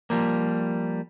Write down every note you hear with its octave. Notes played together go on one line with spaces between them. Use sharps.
F3 G3 A#3